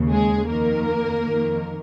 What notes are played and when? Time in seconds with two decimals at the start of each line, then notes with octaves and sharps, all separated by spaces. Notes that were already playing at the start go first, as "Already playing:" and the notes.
Already playing: D#2 C#3
0.10 G#3 G#4
0.47 F2 D#3 A#3 A#4
1.23 F2 D#3